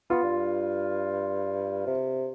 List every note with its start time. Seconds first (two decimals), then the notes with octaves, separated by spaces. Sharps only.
0.10 B3 F4
0.23 G2
1.87 C3